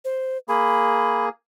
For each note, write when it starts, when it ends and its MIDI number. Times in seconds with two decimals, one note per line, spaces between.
0.05 0.38 72
0.48 1.29 58
0.48 1.29 68
0.48 1.25 83